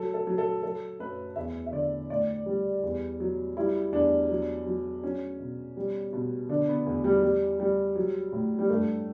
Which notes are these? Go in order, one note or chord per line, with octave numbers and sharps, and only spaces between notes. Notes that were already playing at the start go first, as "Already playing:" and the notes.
Already playing: F#3 A4
A4
F#3
A4
F#3 A4
F#2 B4
E2 E5
E5
D3 D5
A2 D5
G3
E2
F#3
G3 E4
E2 D4
F#3
F#3
F#3 C#4
B2
G3
B2
D3 D4
B3
E2
G3
G3
G3
F#3
A2
G3
G2 A3